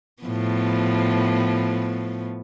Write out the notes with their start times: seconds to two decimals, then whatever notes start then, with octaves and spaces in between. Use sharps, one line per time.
0.23 A2 F3 B3